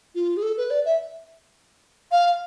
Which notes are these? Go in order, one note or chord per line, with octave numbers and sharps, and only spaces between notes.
F4
G#4
A4
B4
D5
E5
F5